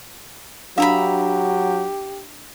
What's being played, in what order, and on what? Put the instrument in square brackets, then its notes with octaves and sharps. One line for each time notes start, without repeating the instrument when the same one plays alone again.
[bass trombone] F#3 [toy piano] D4 A4 F5 [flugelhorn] G4 [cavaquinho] E5 A#5 B5